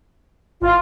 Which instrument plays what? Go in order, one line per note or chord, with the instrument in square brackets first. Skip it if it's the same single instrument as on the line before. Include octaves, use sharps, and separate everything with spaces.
[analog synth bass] G#1 [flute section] F4